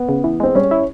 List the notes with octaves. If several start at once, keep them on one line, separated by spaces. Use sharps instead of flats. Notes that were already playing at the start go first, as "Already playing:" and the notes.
Already playing: B3
C#3
E3
G#3 C4
G3 C#4
E4